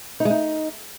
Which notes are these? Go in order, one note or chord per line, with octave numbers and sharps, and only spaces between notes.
D#4
G#3
D#4